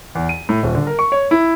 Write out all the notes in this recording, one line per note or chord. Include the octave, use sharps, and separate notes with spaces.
E2
D#7
A2
D#1
D3
A#4
C#6
C#5
E4